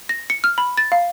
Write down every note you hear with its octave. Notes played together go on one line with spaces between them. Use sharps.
A#6
C#7
F6
B5
A6
F5